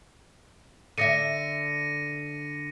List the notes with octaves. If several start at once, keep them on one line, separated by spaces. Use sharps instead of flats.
D3 D#5 E5 A#6 C#7 D#7